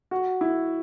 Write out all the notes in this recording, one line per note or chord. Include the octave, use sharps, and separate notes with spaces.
F#4
E4